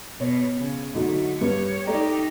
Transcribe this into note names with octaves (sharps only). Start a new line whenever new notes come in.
B2 C#5
C#3
D3 F#3 A3 D#4
G2 C#5
A3 D#4 G4 D5 A#5